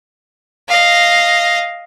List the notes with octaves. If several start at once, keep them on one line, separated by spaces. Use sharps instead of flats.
D#5 F5